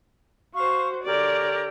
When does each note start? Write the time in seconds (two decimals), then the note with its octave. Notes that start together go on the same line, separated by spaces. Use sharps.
0.54 F#4 C5 F5 C#6
1.05 D3 G4 A#4 C#5 D5